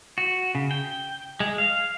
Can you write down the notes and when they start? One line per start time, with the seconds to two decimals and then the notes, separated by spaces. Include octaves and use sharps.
0.18 F#4
0.55 C#3
0.71 G5
1.40 G#3
1.58 F5